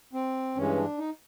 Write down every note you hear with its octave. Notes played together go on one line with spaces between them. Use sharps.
C4
G2 E3 G#3 C#4
D4
D#4